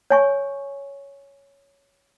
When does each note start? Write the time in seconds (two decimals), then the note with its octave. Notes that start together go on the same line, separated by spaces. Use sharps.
0.10 C#5 G#5 C#6